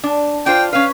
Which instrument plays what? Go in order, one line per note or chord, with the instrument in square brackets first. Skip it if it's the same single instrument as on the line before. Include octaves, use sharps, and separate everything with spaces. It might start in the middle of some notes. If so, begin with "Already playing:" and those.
[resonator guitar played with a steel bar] D4
[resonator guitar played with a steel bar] D4 F4 C5 [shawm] G5
[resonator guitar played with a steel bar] C#4 B4 [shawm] F5